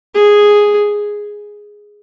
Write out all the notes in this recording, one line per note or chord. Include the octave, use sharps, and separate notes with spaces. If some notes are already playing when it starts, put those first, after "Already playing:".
G#4